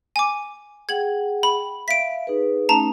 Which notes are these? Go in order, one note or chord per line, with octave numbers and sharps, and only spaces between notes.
G#5 D6
G#4 F#5 G5 G#6 F#7
B5
E5 F5 B6 D7
D#4 G#4 B4
A3 C#4 D#4 A5 A#5